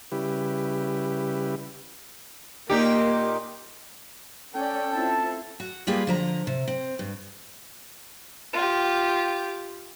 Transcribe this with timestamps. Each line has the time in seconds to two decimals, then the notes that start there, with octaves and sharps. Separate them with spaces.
0.12 C#3 G3 E4 G4 B4
2.70 A#2 A#3 D#4 G4
4.55 C#4 A4 D5 G5
4.93 C4 E4 F4 A5
5.60 F#4
5.87 G3 A#3 F4 G4 G#4 B4
6.07 D3 F3 A#5
6.47 C3
6.68 C4
6.99 G2
8.54 F4 G4